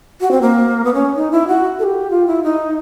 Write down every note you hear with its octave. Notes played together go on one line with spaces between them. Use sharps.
F#4
C4
A#3
B3
C#4
D#4
E4
F#4
A4
G4
F4
E4
D#4